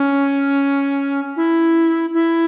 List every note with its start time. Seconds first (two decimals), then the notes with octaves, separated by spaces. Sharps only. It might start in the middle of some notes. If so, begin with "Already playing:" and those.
Already playing: C#4
1.36 E4
2.14 E4